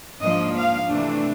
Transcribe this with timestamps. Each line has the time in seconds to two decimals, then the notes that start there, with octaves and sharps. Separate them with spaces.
0.22 G#2 F3 A#3 D4 D#5
0.56 F5
0.89 C3 E3 A3 D4